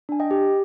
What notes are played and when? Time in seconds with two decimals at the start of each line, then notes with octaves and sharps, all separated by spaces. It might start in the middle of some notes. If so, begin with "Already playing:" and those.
0.09 D4 G#5
0.20 D#5 G5
0.31 G4